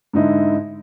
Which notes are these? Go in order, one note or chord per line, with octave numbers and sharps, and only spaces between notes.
G#2 D3 D#4 E4